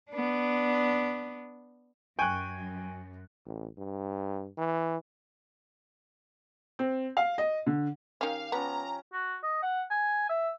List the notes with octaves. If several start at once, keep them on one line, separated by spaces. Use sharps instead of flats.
B3 D4
F#2 G5 G#5 C#6 F#6
A1
G2
E3
C4
F5
D#5
D3
D#3 C#4 G4 F5
F3 B3 C#4 G4 A#5
F#4
D#5
F#5
G#5
E5